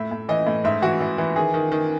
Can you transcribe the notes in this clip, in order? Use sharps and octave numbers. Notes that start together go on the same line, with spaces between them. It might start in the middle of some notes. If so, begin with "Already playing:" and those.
Already playing: A2 E5
A2
E3 D#5
A2
G#2 E5
E3 F#4
E3
E3
D#3 G#4
D#3
D#3